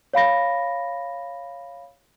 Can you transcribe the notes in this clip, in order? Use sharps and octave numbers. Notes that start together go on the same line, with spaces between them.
C#5 F5 B5 A#6